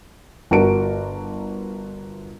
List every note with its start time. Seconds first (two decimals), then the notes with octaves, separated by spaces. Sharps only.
0.51 G1 F#4 A#4 A5 D7